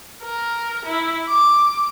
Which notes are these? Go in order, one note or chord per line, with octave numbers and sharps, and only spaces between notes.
A#4
E4
D6